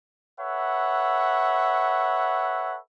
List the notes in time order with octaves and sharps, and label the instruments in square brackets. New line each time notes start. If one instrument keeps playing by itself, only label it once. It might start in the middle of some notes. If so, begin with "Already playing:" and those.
[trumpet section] A4 B4 C#5 E5 F#5